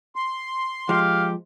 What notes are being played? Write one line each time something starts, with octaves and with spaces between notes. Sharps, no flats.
C6
F3 G#3 G4 F5